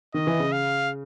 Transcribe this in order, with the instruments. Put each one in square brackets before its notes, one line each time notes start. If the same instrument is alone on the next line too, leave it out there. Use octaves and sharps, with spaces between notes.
[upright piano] D#3 [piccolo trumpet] D#5
[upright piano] E3
C#3
[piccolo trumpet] F5